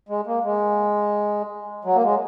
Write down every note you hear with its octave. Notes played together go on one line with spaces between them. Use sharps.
G#3
A#3
G#3
F#3
A#3
G#3